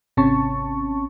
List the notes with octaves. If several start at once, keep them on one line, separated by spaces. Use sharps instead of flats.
G#1 C3 C#4 A5 C#6